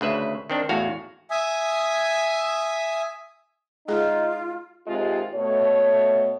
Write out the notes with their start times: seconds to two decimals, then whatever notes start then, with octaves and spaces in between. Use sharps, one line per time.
0.01 D2 C#3 B4 E5
0.50 D#3 C4 D4
0.69 E2 A2 F#4 F5
1.31 E5 G#5 D#6
3.88 G#3 D#4 F4 G#4
4.86 D#2 G#2 C3 G#3 F4 D#5
5.34 B2 A3 C#5